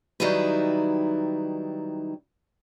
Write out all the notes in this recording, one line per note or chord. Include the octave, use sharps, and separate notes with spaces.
D#3 F#3 G3 D#4 E4 B4